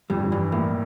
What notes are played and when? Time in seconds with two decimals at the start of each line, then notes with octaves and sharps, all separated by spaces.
0.10 F2 G3
0.17 G2
0.24 F2
0.32 G2 E3
0.52 A2 A#3